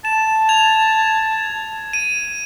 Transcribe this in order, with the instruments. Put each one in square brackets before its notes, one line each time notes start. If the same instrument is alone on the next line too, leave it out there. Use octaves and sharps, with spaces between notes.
[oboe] A5 [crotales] E7
[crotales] G#6 F7
D#7